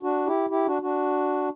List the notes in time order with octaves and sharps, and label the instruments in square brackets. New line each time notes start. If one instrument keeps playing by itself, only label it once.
[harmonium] D4 F#4
E4 G4
E4 G4
D4 F#4
D4 F#4